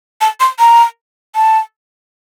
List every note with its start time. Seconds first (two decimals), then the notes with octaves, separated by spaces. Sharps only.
0.21 A5
0.40 C6
0.59 A#5
1.35 A5